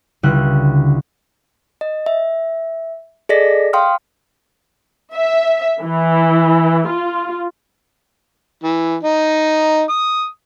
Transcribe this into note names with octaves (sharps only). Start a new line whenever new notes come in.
C#2 D3 G3 E4 F#6
D#5
E5
G#4 A4 D5 D#5 A#6 B6
F5 G5 C6 D#6 F6
E5
E3
F4
E3
D#4
D#6